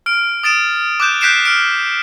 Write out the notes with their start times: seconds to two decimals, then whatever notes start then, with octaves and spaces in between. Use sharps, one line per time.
0.06 F6 D7
0.43 D#6 A6 D7 E7
1.00 D6 F#6 G6 E7
1.21 F#6 G6 B6 C7 D7 E7
1.45 F6 D7